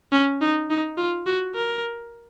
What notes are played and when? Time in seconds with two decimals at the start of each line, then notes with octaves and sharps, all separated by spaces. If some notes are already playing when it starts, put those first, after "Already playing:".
0.12 C#4
0.41 D#4
0.70 D#4
0.98 F4
1.26 F#4
1.55 A#4